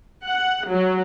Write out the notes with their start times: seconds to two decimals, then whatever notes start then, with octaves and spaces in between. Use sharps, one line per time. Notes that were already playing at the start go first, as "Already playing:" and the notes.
0.25 F#5
0.68 F#3